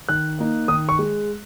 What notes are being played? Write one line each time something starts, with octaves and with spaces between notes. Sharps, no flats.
D#3 F#6
A#3 D#4
D#3 D#6
C#6
G#3